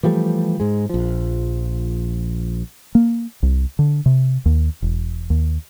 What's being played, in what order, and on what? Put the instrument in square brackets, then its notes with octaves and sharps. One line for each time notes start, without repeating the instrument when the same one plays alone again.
[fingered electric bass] E3 F3 G3 A3
G#2 G#3
A#1 F3
A#3
C2
D3
C3
D#2
E1
D#2